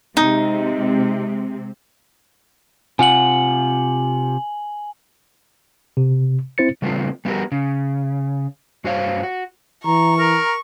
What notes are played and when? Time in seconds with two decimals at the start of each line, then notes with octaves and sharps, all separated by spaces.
0.17 C3 G#3 C4 D#4
2.99 C3 F4 F#5 G#5 F#7
5.97 C3
6.58 C4 E4 C5 A6 C#7
6.82 C#3 G3 A3 B3 C4 F4
7.25 G3 B3 F#4 G4 A#4
7.52 C#3
8.84 G2 F#4 C5 C#5 F5
9.23 F#4
9.85 E3 A#5 C#6
10.19 A#4 A#5